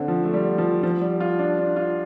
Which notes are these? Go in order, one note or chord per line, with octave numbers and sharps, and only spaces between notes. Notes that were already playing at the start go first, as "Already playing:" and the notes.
Already playing: D3 C4 D4
F3
A3
G3
F3
F3
G3
F4
D4
D4
F4